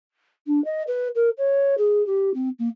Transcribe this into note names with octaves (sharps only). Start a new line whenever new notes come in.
D4
D#5
B4
A#4
C#5
G#4
G4
C4
A#3